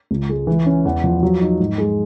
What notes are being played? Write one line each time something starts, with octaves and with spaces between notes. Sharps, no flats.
C#2
G#3
E3
C#4
E2
F3
F#3
D#4
G#2
G#3